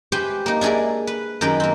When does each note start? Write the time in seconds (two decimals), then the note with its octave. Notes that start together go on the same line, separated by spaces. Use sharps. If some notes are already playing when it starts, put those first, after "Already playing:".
0.12 G4 B4 C5 G5 G#5
0.46 A#3 D#4
0.61 D4 E4 G#4 A#4 D5
1.07 B4
1.41 F#2 D#3 A#4 B4 G5
1.60 A#3 C4